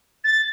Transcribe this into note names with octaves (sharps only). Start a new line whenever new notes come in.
A6